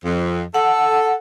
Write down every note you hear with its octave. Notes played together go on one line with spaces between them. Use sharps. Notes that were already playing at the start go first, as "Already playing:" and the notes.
F2
A4 F#5